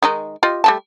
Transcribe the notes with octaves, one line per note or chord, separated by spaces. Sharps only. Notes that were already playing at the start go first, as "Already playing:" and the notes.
D#3 G#3 D#4
F4 G4 D#5
G3 A3 A5